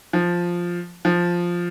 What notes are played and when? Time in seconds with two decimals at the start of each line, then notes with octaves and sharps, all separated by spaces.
0.13 F3
1.05 F3